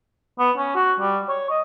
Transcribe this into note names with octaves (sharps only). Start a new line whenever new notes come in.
B3
C#4
F#4
G3
C#5
D#5